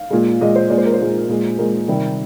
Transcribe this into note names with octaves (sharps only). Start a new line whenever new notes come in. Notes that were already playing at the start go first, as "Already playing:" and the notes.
Already playing: F5
A#2 G#3
A#2 G#3 D#5
C5
A#2 G#3 D5
C5
A#4
C5
A#2 G#3
A#2 G#3
A#2 G#3 A#4
C3 D#3 G3